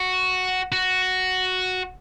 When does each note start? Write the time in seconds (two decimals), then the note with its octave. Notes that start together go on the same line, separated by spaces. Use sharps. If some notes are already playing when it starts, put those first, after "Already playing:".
Already playing: F#4
0.72 F#4